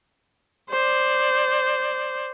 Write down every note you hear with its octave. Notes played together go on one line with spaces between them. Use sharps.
C5 D5